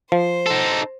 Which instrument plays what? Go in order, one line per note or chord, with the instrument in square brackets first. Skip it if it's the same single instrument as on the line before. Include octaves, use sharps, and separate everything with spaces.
[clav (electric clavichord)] F3 [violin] C5
[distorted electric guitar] D#4 A4